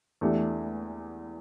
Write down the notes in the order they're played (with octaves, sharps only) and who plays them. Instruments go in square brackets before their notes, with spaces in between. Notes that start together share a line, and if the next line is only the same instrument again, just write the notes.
[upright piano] E2 E3 A3 D4 G4